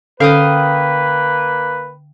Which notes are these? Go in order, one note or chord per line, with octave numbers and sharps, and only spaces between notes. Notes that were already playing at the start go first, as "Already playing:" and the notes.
D3 A#3 C#4 A4 B4 F5 G5 D#6